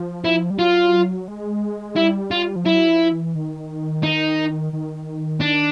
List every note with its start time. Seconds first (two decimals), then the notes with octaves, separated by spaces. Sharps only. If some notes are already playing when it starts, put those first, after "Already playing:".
Already playing: F3
0.24 E4
0.50 G3
0.59 F#3 F4
1.28 G#3
1.96 G3 E4
2.31 F4
2.56 F3
2.66 F#3 E4
2.88 F3
3.12 E3
3.35 D#3
4.03 D#4
4.73 D#3
5.41 D4